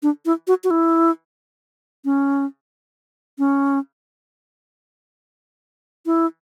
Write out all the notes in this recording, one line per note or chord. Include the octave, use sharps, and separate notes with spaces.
D4
E4
F#4
F#4
E4
C#4
C#4
E4